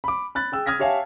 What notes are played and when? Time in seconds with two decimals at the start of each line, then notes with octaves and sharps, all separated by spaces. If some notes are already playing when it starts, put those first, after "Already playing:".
0.04 B5 D6
0.35 B5 F#6 A6
0.52 G#4 G5 E6
0.66 D#6 F6 G#6 A#6 B6
0.79 G4 C#5 E5 F5 G#5 A5